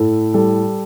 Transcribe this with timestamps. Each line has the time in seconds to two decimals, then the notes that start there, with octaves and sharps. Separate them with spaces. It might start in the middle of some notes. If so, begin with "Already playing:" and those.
Already playing: A2 A4
0.34 G3 A4